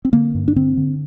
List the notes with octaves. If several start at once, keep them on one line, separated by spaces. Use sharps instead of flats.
C4
D3 A#3
G2
D4
D3 C4
D3